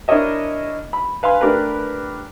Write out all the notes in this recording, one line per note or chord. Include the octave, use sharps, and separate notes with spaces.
D4 E4 A#4 C#5 D#5 E5
B5
B4 F5 G#5 C6
A3 D4 G4 A#4 B4